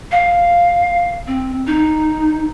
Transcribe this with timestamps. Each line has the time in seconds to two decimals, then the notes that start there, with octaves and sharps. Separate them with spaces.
0.12 F5
1.27 C4
1.67 D#4